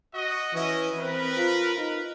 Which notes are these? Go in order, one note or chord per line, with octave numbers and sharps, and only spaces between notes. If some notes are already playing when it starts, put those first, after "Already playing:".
F#4 D#5
E3 C#4 E4 D#5
C4 A#4 B4
F4
D#4